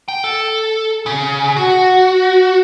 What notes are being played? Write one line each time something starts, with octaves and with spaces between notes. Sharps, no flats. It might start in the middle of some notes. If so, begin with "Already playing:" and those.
G5
A4
C#3
F#4